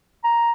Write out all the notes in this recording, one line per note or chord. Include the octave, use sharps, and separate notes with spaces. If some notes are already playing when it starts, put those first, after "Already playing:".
A#5